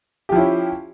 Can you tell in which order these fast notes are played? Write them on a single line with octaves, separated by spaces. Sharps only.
G4 F3 E4 C#4